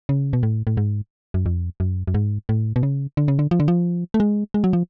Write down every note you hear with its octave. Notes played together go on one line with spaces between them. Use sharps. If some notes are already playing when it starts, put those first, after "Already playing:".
C#3
B2
A2
A2
G#2
F#2
F2
F#2
F#2
G#2
A2
B2
C#3
D3
C#3
D3
F3
D3
F3
A3
G#3
G#3
F#3
F3